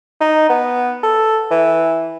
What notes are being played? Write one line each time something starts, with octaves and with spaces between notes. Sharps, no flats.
D#4
B3
A4
E3